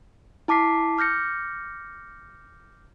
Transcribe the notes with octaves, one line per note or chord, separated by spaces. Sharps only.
E4 A5 D6 B6 C7
D6 F6 G6 A#6 C#7